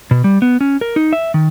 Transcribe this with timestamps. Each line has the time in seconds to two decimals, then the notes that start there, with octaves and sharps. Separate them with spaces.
0.11 B2
0.24 G3
0.42 B3
0.61 C#4
0.81 A#4
0.96 D#4
1.13 E5
1.34 D#3